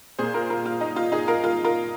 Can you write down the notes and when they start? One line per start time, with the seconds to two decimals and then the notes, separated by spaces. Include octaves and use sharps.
0.19 A#2 A#3 G#4 C5
0.34 F4 A#4
0.50 F4 A#4
0.66 F4
0.81 D#4
0.96 F4
1.12 D#4 G#4
1.28 F4 A#4
1.44 F4 A#4
1.64 F4 A#4